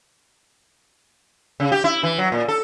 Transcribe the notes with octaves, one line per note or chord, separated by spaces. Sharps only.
C#3
G4
E4
E3
F#3
A#2
A4